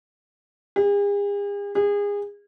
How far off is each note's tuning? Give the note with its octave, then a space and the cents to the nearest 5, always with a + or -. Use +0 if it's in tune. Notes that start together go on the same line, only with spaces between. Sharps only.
G#4 -45
G#4 -30